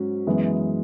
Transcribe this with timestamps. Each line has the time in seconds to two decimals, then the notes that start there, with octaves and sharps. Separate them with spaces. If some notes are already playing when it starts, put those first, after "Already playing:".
Already playing: G#2 F#3 C#4 F#4
0.27 F#2 E3 G#3 B3